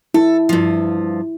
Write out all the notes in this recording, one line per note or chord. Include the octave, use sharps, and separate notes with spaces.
E4 A4
G2 F3